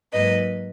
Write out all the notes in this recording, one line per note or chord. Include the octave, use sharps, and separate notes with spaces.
G#2 F#3 A#3 B4 D#5